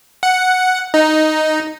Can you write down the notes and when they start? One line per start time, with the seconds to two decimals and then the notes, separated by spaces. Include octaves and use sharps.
0.23 F#5
0.94 D#4